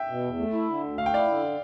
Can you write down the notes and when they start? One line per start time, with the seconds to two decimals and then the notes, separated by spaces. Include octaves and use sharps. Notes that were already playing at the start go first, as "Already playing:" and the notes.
Already playing: E5 G5
0.09 B2
0.24 E2
0.39 A3
0.53 E4
0.68 D3
0.83 D2
0.98 A3 F5
1.06 G5
1.13 E4 D5 F5
1.28 D3